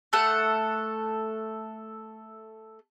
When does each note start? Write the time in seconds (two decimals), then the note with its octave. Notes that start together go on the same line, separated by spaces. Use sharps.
0.13 A3 A4 F#5